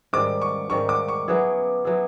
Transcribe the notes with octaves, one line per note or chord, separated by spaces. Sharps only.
G#2 D#3 G3 D6
C#6
G#2 D#3 G3 C#6
D6
C#6
F#3 B3 E4 G#4
F#3 B3 E4 G#4